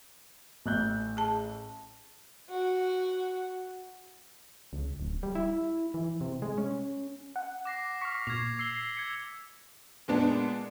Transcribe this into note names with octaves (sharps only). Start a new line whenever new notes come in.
A1 F#6 G6
G#4 A5
F#4
C#2
D1
G3
E4
E3
C3
G#3
C#4
F#5
D6 A#6 C7
C#6 F6 B6
A#2 G#6 C7 F7
E6 C7 G7
G#6 C#7
A#2 G#3 B3 D4